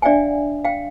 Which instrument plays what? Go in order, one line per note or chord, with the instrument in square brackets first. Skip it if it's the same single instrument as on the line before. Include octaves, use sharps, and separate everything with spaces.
[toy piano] D4 D5 E5 F5 G5 G#5
F5 G5